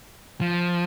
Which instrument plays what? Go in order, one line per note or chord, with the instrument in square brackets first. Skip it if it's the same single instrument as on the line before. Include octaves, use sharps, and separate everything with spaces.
[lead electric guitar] F3